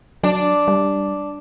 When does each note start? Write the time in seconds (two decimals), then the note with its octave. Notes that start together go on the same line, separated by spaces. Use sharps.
0.24 F#3 D4
0.68 G3